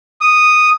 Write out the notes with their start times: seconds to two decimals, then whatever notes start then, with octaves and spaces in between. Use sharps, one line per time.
0.21 D#6